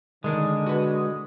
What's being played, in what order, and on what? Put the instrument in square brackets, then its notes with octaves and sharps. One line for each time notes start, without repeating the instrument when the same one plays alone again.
[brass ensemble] D3 [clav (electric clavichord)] D#3 D4 A#4 [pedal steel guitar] G#3
[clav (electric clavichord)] F#4 B4